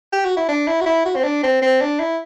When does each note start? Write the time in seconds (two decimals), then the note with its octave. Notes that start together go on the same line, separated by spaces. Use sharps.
0.13 G4
0.25 F#4
0.37 E4
0.49 D4
0.67 E4
0.81 F#4
0.86 E4
1.06 F#4
1.16 C4
1.24 D4
1.43 C4
1.62 C4
1.81 D4
2.00 E4